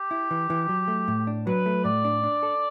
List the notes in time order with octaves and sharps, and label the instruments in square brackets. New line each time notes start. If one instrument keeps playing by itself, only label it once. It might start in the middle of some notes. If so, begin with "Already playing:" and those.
Already playing: [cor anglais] G4
[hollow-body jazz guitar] E4
E3
E3
F#3
A3
A2
D4
[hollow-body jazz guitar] F#3 [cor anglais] B4
[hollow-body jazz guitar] A3
[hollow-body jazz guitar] A2 [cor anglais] D5
[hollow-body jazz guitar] D4
D4
A4